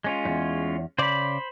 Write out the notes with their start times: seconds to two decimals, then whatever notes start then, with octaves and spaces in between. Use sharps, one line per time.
0.04 G#3 C#4 F4
0.25 E2 G2
0.98 C#3 C5 D5 B5